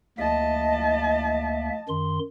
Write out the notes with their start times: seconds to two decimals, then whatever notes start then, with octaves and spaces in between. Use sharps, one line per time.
0.18 D2 A#3 D#5 E5 A5
1.89 F#2 D#3 C6